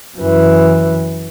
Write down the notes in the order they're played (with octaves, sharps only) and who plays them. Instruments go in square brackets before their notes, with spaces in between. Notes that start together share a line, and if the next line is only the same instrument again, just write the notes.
[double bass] F#2 E3